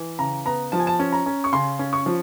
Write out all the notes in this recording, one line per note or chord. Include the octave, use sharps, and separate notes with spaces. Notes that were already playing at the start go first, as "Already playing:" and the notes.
Already playing: E3
C#3 A#5
B3 A#5
F3 A5
G#5
A5
C#4
A#5
C#4
C#6
C#3 C6
C#4
C#6
F3